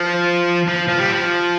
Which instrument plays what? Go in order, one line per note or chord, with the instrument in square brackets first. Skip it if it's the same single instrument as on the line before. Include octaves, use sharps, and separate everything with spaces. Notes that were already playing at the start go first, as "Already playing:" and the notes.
Already playing: [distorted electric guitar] F3
F3
F3
G3
F3